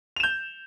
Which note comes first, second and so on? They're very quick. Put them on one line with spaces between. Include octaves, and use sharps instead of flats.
F7 E7 G6